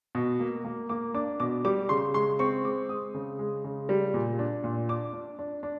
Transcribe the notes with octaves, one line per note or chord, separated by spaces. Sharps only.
B2
A#3
A#3
A#3 D6
D4 D6
B2 D6
G3 D6
C#3 C6
G#3 C6
C4 C#6
G#3 D6
G#3 D#6
C#3
G#3
C#3
G3
A#2
D4
A#2
D4 D6
D4
D4
D4